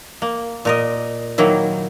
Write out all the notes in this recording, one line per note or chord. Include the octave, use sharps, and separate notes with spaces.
A#3
A#2 A#4 D#5
D#3 F#3 A#3 E4